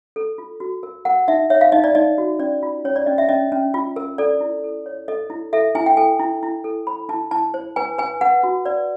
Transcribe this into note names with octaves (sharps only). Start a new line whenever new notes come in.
A4
F4
F#4
A#4
A#4 F#5
D#4 E5
C#5 E5
F5
D#4 D#5
D5
D#4 D#5
F#4
C#4 D5
F4
C#4 C#5
D5
C#4 D#5
E5
C#4 D#5
C#4
F4
A#4
A4 D5
E4
A4
C#5
A4 D#5
E4
A4 E5
E4 G#5
G5
A4 G#5
E4
E4
A4
C5 B5
E4 A5
E4 A5
C5
B4 G#5
B4 G#5
B4 F#5
F#4
B4 D5